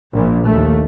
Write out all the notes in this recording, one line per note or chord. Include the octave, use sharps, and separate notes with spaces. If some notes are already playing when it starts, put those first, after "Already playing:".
A#1 A#2
D#2 A3